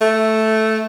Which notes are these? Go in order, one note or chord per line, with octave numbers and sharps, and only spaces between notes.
A3